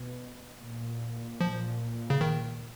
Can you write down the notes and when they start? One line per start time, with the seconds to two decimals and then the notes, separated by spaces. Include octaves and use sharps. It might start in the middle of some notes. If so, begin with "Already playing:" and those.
Already playing: B2
0.60 A#2
1.41 F3
2.10 C#3
2.21 D#3